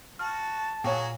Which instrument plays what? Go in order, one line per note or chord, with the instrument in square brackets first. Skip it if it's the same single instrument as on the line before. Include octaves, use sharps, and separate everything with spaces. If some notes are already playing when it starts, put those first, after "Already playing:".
[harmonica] F#4 [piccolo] A5 [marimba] F6
[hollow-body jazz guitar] A#2 [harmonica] F#3 F#4 G#4 [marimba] C#5 G5